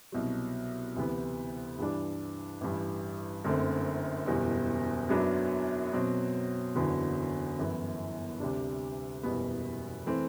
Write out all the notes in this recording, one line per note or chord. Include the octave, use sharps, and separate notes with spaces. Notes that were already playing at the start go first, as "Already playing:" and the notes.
C2 B2 F#3
D2 C3 E3 B3
G2 E3 G3 D4
A1 G2 E3
F#1 F#2 D3 A3 C4
F#1 E2 B2 G3
F#1 F#2 F#3 B3 D4
B2 F#3 C4
F#1 E2 D3 F#3 B3
G1 F#2 E3 B3 E4
D2 C3 G3 D4
F#1 E2 B2 G3 B3
E3 A3 C4